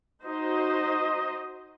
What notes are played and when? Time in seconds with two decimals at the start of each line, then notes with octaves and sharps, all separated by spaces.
0.24 D#4 F#4 C5 D#5